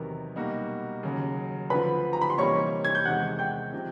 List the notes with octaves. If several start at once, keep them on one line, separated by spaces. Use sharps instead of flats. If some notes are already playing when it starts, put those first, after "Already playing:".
Already playing: E2 C3 D#3 F#3 B3 A#4
B2 G3 A#3 D#4 F#4
D#2 C#3 F#3
D2 D3 F3 B4 B5
A#5
B5
C6
C3 E3 G3 A#3 D#4 C#5 C#6
G#6
G6
E2 C3 D#3 G#3 F#5 F#6
G5 G6
C3 F3